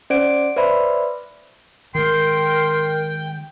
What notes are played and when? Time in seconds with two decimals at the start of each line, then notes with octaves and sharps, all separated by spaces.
0.10 C#4 C5 D5 F#5 D7
0.56 B4 C5 D5 E5 B5
1.95 D#3 G#3 A#4 G5 C6